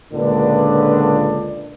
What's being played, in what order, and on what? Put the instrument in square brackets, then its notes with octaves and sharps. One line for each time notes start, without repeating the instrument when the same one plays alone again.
[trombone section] C#2 A#2 D3 D4 B4